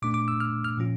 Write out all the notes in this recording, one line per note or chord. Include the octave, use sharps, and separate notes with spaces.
A#2 A3 D4 D6
D6
E6
F6
F6
A#2 F3 C#4 F4